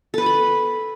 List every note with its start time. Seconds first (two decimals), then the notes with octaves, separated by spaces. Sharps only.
0.14 A4
0.18 B4
0.22 G#5
0.26 B5